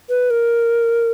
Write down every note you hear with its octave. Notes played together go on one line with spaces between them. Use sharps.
B4
A#4